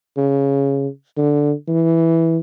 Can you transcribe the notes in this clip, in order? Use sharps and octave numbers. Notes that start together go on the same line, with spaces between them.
C#3
D3
E3